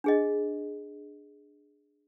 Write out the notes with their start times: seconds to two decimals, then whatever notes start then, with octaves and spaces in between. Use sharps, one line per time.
0.04 D4 G#4 D#5